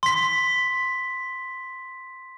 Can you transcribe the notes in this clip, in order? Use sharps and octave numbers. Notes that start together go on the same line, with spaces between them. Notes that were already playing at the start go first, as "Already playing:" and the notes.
C6 B6